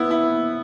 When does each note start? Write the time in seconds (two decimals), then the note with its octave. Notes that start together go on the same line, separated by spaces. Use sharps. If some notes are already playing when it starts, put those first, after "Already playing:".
Already playing: B3 E4
0.11 E4